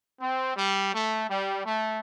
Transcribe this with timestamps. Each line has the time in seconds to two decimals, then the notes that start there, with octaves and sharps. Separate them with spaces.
0.21 C4
0.57 G3
0.93 A3
1.30 G3
1.66 A3